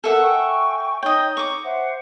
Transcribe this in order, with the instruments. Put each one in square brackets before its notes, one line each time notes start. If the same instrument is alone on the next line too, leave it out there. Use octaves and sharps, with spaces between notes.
[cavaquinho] A4 E5 F#5 [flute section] A#4
[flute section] G5 G#5 C#6
[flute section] D#4 C#5 [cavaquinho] D#5 G5
[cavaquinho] C#6 D6
[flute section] C5 E5 F#5